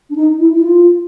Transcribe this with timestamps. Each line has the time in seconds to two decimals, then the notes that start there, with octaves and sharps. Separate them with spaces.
0.10 D4
0.16 D#4
0.39 E4
0.56 E4
0.62 F4